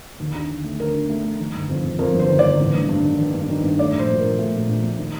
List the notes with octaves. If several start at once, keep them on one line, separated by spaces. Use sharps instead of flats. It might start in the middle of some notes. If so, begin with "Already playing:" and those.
D#2
D4
D3
A3
D3 A#4
D4
A3
A3
D#3
G1
F2
F2
F2 A#4
G1
C5
D#3
D5
G1
A1
G2
G2
D#3
D#3
G2
D#3
G2
A3 D5
A#1
C5
A#2
A#1 A#4
A3
A#2
A#1
A3
D#3